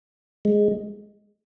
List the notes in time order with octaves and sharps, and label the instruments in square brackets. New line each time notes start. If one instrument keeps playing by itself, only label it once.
[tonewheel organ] G#3